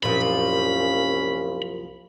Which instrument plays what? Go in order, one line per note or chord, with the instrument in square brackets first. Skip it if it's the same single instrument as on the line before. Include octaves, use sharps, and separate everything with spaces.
[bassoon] C2 [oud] F#2 A#2 F3 [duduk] C#4 [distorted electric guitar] B5